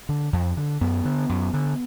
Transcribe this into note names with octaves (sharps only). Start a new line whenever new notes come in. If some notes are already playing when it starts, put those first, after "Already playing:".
D3
F2
D3
F#2 B3
D3
F#2
D3